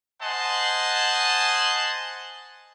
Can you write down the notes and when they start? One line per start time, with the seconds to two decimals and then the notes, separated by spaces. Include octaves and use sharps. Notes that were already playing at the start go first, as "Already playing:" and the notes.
0.21 C5 D#5 F#5 G#5 A5 C6